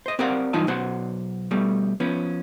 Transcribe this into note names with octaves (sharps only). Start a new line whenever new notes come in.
C5 D#5
C4 G4 A#4 D5 F5 F#5
G2 E3 D#4 F4 G#5 A5
B1 B2 F#4 C5 F#5
B2 G3 A3
F3 B3 C#4